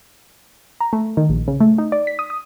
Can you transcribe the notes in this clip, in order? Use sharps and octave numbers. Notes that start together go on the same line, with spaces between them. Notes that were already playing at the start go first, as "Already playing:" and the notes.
A#5
A3
D#3
A#1
C#3
A3
D#4
D5
B6
D#6
D#6